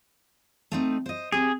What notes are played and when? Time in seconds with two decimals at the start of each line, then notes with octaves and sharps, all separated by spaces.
0.72 A3 C4 D#4
1.06 C5 D#5
1.32 C4 G4 G#4